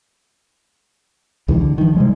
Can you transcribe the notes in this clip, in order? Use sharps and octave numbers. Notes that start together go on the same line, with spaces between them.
C#2 C3 D#3 E3
D3
D#3 F3
C3 G3 G#3